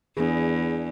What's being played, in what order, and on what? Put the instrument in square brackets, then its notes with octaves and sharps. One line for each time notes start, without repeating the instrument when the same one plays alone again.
[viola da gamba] E2 [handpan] D4 E4 G#4